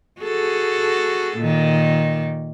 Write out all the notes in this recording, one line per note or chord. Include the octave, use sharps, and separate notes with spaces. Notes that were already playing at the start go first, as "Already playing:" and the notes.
F#4 G#4 A4
A#2 D#3